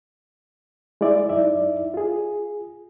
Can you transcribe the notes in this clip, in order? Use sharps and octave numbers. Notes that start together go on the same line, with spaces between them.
G#3 E4 D5 E5
F#2 D#4 E4 D5 E5
F4 G#4